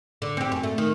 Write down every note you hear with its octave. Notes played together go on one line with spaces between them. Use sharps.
D3
C4 G4
F#2
A3
D#3